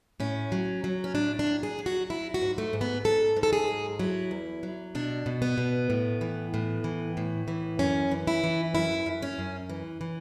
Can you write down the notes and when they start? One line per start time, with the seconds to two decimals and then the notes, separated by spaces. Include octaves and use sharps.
0.20 A2 C#4
0.52 F#3
0.84 F#3
1.04 C#4
1.15 A2 D4
1.39 D4
1.47 F#3
1.63 G#4
1.79 F#3
1.86 F#4
2.10 F#3 E4
2.34 F#4
2.41 G#2
2.58 A3
2.73 G#2
2.81 B3
3.04 G#2 A4
3.36 G#2
3.43 A4
3.53 G#4
3.68 F#3
3.99 F#3 E4
4.31 E2
4.63 F#3
4.95 B2 D4
5.26 B2
5.42 B3
5.58 B2
5.90 A2
6.21 E3
6.54 A2
6.84 E3
7.17 A2
7.48 E3
7.79 F#2 C#4
8.11 E3
8.27 E4
8.44 E3
8.75 F#2 E4
9.06 F#2
9.22 C#4
9.38 F#2
9.69 E3
10.01 E3